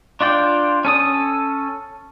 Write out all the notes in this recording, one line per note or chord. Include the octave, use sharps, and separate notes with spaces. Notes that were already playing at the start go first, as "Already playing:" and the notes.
D4 F4 D5 G5
C#4 A4 D#6